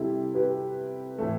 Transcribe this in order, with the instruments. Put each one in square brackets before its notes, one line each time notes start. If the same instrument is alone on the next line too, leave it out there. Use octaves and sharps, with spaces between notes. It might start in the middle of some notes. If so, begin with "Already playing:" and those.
Already playing: [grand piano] C3 G3 C4 [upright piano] E4 G4 A4
[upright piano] G4 B4
[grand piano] A2 E3 A3